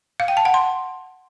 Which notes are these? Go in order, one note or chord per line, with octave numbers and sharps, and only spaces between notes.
F5
G5
A5
F#5
C6